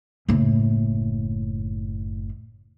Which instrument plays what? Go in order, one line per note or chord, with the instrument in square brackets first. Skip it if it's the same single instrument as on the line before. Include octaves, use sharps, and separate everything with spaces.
[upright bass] F#1 A2